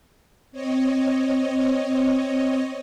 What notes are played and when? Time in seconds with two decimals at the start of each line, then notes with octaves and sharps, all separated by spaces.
0.52 C4 C#5 D#5